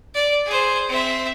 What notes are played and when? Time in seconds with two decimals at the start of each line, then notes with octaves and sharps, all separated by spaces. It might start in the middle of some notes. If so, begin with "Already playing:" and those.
0.15 D5
0.46 G#4 C5
0.89 C4 E5